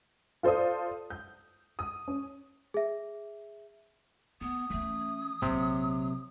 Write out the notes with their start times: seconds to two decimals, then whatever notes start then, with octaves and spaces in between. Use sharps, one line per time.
0.43 F4 A4 C5 D5 D#6
1.10 G6
1.79 D#6
2.08 C#4
2.74 G#4 E5
4.41 A3 B3 D#6
4.70 E3 A3 C#4
5.42 A#1 C3 F#3 D#4